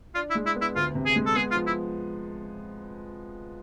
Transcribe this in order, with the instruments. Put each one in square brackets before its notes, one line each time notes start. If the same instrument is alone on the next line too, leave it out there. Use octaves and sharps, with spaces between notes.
[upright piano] D4 [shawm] F4
[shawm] E4
[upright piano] G#3
[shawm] E4
[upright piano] B3
[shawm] E4
[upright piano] D2 [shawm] F4
[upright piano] C3
[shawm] G#4
[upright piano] G#3
[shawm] A4
[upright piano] B3 [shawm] G#4
[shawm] F4
[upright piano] F3
[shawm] E4